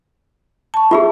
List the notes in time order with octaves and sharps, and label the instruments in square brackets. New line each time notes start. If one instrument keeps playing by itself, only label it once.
[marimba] A5 C#6
[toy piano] F4 G4 G#4 [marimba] E5